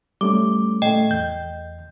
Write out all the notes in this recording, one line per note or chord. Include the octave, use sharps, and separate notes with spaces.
G3 A3 C#4 D6
A2 A3 D#5 G5
E2 G6